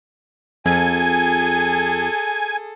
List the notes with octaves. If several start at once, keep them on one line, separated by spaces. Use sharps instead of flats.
F2 G#4 A4 G#5